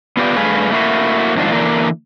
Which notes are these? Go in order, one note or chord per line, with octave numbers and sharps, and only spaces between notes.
B3 F4 G4 D5
G2 A3 G#4 B4 F5
A3 A#3 E4 F#4
F2 G#2 D#3 D4 F4
D3 E3 A#3 D4